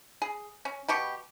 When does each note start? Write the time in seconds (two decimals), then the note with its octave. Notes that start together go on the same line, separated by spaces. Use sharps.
0.22 G#4
0.65 C#4
0.89 B2 G4 C#6